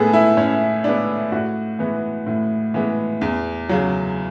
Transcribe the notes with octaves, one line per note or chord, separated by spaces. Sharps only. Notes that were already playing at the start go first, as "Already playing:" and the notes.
Already playing: A2 G#3 B3 G#4 A4
E4
A2 C#4
G#3 B3 D4
A2 F#4
E3 G#3 B3
A2
E3 G#3 B3
E2
C#3 F#3